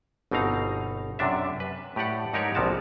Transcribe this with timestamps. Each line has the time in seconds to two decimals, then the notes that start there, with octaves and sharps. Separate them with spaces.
0.31 G1 B2 C4 D#4 F5 A#5
1.19 F#2 C3 D4 E5
1.60 B4
1.96 A2 G4 B4 D5 F#5
2.33 G#2 D#4 G4 A#4 C#5 D5
2.55 A#1 C3 F3 B3 F#4 A5